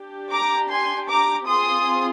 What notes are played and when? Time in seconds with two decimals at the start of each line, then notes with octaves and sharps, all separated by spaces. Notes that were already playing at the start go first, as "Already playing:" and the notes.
Already playing: D4 G4
0.31 A#5 D6
0.69 G#5 C6
1.08 A#5 D6
1.46 C4 F4 G#4 C6 D#6